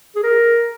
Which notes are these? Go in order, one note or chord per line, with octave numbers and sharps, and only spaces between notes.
G#4
A#4